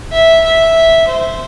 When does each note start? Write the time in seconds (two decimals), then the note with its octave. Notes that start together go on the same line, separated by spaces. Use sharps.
0.12 E5
0.44 E5
1.08 C5